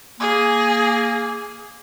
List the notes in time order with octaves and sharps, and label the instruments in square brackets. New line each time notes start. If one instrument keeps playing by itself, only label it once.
[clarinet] A#3 [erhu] G#4